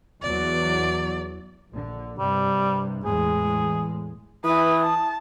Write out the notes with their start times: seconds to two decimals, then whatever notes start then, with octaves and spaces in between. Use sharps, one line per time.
0.22 E2 F#3 D5
1.70 A#1 D3
2.19 G2 C3 G3
3.05 E2 A2 G#3 G#4
4.44 E3 B4 D#6
4.81 A5